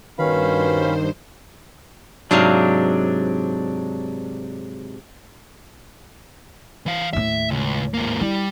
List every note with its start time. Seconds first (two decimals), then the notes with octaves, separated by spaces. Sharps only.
0.19 G2 B2 D#3 C#4 C5 F5 B5
2.31 G#2 C3 F#3 D4 F5
6.86 E3 F5
7.13 D#2 A2 E5
7.51 C#2
7.94 G#2 A#3
8.21 G3 E4